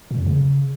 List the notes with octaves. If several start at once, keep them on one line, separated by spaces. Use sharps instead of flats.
A#2
F2
C#3